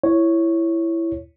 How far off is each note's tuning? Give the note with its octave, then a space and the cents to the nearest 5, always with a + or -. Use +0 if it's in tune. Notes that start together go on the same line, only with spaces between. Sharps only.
E4 +15 C#5 +0